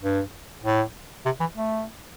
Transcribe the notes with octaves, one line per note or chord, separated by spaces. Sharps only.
G2
A2
C3
E3
A3